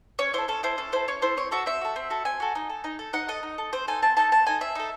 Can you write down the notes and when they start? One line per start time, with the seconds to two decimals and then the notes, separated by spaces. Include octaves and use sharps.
0.19 C#4 C#5
0.33 E4 A4 C5
0.48 C#4 A4
0.63 E4 A4 C5
0.78 C#4 A4
0.92 E4 A4 C5
1.08 C#4 C#5
1.22 E4 A4 C5
1.37 C4 C#5
1.51 F#4 A4 E5
1.66 C4 E5
1.81 F#4 A4
1.96 C4
2.10 F#4 A4
2.25 C4 G#5
2.40 F#4 A4
2.55 D#4
2.69 A4
2.84 D#4
2.99 A4
3.13 D#4 F#5
3.28 A4 D#5
3.43 D#4
3.58 A4
3.73 C4 C5
3.88 D#4 A4 G#5
4.02 C4 A5
4.17 D#4 A4 A5
4.32 C4 A5
4.46 D#4 A4 G#5
4.61 C4 E5
4.75 D#4 A4